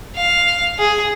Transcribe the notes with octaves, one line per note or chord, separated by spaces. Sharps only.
F5
G#4